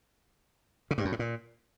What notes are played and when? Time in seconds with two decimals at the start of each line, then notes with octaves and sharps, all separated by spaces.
0.91 C#3
0.98 G2
1.05 F#2
1.12 A2
1.19 A#2